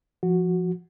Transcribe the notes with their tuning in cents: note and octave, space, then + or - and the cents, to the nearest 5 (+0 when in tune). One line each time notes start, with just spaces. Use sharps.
F3 -10 F#4 -10